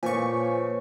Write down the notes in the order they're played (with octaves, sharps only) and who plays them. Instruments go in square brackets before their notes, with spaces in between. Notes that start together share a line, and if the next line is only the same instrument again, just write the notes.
[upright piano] A#2 [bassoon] F3 [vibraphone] B4 C#5 [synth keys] G#5 C#6